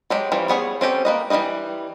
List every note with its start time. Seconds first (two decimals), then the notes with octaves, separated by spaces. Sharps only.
0.10 F#3 G#3 G4
0.32 E3 F3 G3 C#4
0.48 G3 B3 G#4 C#5
0.81 C4 C#4 G4 A4
1.05 A#3 B4 D#5
1.30 E3 G3 A3 B4 D#5